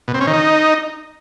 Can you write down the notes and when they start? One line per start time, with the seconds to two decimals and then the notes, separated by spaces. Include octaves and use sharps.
0.08 B2
0.14 C4
0.21 C#4
0.27 D#3
0.33 D#4